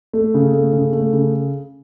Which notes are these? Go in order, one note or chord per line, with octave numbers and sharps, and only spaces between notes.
A3
C#3
A3
C#3
A3
C#3